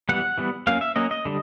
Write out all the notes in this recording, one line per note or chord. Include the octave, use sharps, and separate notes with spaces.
E3 G3 B3 F#5
E3 G3 B3
F#3 A#3 C#4 F5
E5
F#3 A#3 C#4 D#5
D#5
D3 G3